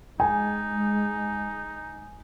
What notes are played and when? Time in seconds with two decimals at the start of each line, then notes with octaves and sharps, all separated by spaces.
0.20 G#3 D#4 G#5